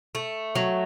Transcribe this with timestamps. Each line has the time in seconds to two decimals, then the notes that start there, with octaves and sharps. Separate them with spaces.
0.15 A3
0.55 F#3